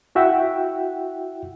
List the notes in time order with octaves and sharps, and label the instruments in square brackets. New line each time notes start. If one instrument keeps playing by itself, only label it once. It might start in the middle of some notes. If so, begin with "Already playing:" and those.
[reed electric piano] E4 F#4 E5 F#5 G5